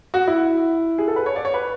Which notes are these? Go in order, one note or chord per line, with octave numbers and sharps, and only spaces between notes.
F#4
E4
G#4
A4
B4
C#5
D5
C#5
B4